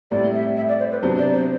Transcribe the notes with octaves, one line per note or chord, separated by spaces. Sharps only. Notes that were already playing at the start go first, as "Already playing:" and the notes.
A2 G3 C4 E4 D5
E5
E5
D5
C5
B4
C3 F#3 B3 D4 C5
D5
C5